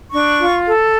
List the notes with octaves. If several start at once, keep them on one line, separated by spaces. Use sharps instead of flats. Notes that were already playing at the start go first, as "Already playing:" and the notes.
D4 C#6
F4
A4